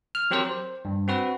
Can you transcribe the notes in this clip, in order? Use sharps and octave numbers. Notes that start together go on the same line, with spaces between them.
F6
F#3 C4 G4 A#4 C5
C5
G2
C4 F#4 B4